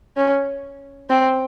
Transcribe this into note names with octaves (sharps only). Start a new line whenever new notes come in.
C#4
C4